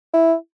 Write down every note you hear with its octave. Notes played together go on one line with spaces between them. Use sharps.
E4